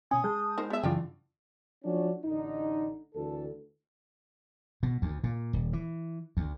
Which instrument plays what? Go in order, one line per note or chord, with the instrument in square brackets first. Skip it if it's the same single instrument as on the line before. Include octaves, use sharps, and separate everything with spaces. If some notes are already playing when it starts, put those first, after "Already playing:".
[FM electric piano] B2 C#4 [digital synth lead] G#5 [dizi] D#6
[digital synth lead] G#3 [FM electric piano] A5 G6
[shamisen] D#4 A#4 C5
[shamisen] B3 E5 [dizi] G#4
[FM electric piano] F#2 C#3 E3 [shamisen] D4 F4 G5
[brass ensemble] F3 A3 C#4 D4 F#4
A1 D3 D#4
D2 E3 A4
[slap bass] B2
D2
A#2
D#1
E3
D2